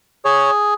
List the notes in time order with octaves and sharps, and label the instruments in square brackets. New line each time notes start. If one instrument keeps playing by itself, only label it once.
[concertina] G#4 C#5